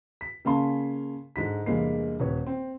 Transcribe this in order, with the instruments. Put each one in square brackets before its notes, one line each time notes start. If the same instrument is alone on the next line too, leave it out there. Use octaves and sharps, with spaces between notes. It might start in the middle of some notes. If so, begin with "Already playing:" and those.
[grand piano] B6
C#3 A#3 C#4 F5 A5 C6
G#2 D3 B6
E2 G2 C3 G#3 A#3 C7
D#1 B4 C#5
C4